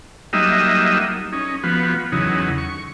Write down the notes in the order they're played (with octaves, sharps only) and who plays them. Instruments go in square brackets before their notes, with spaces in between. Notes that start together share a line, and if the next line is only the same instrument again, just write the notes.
[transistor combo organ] F#3 G3 A#3 D#4 D#5 E5
C#4 D#4
F3 B3 F#4
E2 C#3 F#3 D#4
C#6